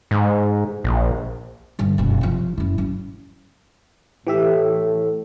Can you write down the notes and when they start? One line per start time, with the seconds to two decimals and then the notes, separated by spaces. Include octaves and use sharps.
0.11 G#2
0.84 A#1
1.79 G2 D3
1.98 F#1 B2
2.21 C3 F3
2.57 F#1 E4
2.78 F#2
4.27 A2 E3 G4 E5